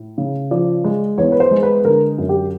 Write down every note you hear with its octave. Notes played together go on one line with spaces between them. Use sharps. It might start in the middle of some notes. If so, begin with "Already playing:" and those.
Already playing: A2
C#3
F3 D5
G#3
E2 C#5
B4
C5
G#3
B4
D3 A#4
F#2
G4